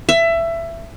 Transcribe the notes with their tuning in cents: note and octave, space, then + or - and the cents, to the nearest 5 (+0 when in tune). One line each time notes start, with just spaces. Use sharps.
E5 +20